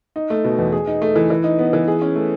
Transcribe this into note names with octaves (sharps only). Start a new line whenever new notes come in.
D#4
A3
B2
E2
G#4
D#4
A3
E3
E3
D#4
B3
E3
G#4
C#4
A3